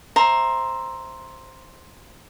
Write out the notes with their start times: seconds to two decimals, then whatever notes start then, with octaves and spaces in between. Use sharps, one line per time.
0.16 C5 E5 A#5 C6